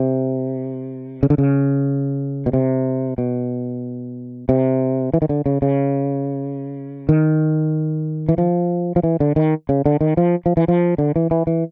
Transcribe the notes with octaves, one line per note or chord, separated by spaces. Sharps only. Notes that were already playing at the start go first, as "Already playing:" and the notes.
Already playing: C3
C#3
D3
C#3
B2
C3
B2
C3
E3
D#3
D3
C#3
C#3
D#3
E3
F3
F3
E3
D3
D#3
C#3
D3
D#3
F3
F3
E3
F3
D3
E3
E3
E3